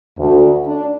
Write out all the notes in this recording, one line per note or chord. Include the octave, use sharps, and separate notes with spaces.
D2
D4